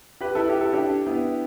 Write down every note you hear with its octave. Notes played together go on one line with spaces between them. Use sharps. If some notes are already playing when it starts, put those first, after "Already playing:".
G4 B4
E4 A4
G4
A4
D4 G4
B3 E4